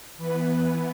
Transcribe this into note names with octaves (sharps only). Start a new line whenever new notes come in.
E3 B3 B4